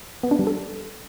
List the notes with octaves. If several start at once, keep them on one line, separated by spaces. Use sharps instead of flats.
B3
D4
G3
A4